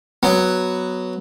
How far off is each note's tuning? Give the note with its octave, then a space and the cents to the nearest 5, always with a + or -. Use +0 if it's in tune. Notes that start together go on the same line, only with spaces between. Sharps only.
F#3 +0 B3 +0